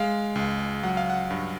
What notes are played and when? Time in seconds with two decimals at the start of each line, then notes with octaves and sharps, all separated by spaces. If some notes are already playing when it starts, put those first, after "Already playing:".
Already playing: G#3 F5
0.35 C#2
0.83 F#3 F#5
0.97 F5
1.10 F#5
1.30 G2